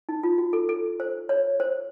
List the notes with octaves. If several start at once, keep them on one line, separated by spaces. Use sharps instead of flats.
D#4
F4
F#4
A4
A4
C5
C#5
C5